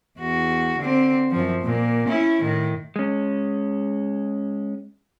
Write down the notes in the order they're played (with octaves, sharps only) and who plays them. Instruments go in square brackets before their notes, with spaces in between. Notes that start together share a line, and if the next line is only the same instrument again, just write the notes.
[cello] E2 F#4
D3 C4
F#2 F3
A#2 A#3
C#4 E4
A2 D#3
[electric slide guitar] G#3 C#4